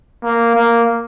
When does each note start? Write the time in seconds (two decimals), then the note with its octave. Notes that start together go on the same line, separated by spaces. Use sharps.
0.23 A#3
0.55 A#3